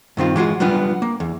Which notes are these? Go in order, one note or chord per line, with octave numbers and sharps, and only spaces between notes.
G2 D#3 C4 F4
E3 G#3 F4 F#4
F#3 G3 B3 D4 F4
A#3
E2